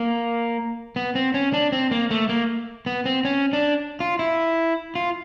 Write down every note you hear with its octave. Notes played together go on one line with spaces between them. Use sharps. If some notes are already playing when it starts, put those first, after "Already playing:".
Already playing: A#3
B3
C4
C#4
D4
C4
A#3
A3
A#3
B3
C4
C#4
D4
F4
E4
F4